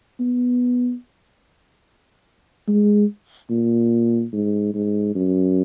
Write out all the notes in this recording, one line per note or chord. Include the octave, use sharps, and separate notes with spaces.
B3
G#3
A#2
G#2
G#2
F#2